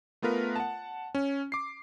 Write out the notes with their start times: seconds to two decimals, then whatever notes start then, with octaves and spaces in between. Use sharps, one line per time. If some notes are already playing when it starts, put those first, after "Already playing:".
0.22 A3 B3 F4 A#4 B4
0.56 F#5 A5
1.15 C#4
1.52 D6 C7